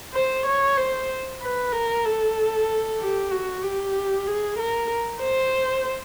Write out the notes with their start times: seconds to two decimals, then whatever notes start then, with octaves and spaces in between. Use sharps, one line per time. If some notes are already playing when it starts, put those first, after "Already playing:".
0.14 C5
0.46 C#5
0.77 C5
1.42 B4
1.72 A#4
2.05 A4
3.00 G4
3.31 F#4
3.63 G4
4.27 G#4
4.59 A#4
5.21 C5